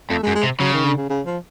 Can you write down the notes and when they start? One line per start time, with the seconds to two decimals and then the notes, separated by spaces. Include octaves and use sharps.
0.10 F2 A3
0.23 G#3
0.27 F#2
0.35 G#3
0.43 C3
0.60 C#3 F#3
0.73 D#3
0.85 D3
0.97 C#3
1.09 C#3
1.26 F3